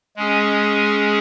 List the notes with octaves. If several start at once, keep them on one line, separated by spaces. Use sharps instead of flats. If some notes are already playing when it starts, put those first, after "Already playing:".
G#3 C#4 G#4